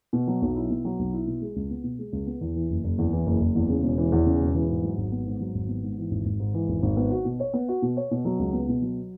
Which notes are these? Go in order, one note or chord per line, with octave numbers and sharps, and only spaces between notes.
B2
F#3
B1
E4
B2
F#3
B1
E4
B2
G#3
C#2
B3
B2
G#3
C#2
B3
E2
E3
F#1
F#1
E2
E3
F#1
F#1
E2
C#3
E1
E3
E2
C#3
E1
E3
G#2
F#3
G#1
B3
G#2
F#3
G#1
B3
G#2
E3
G#1
G#1
G#2
E3
G#1
G#1
B3
F#4
B2
C#5
B3
F#4
B2
C#5
B2
F#3
C#2
B3
B2
F#3